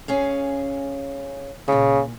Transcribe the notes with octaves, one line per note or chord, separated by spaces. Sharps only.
C#4 G#4 F5
D2 A#2 C#3